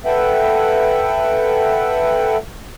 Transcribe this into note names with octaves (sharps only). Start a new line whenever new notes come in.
A4 B4 E5 F#5 G5